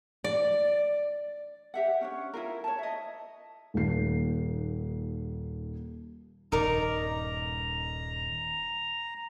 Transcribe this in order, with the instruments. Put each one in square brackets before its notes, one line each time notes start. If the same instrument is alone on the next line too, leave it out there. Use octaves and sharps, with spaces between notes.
[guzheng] D5
[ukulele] G4 E5 F#5
C#4 D4 C#5
E4 F4 A#4
C#5 A5
D#5 E5
[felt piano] D#1 D#2 C7
[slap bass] D#1 G2 [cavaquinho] D#4 A#4 D5 [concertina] A#5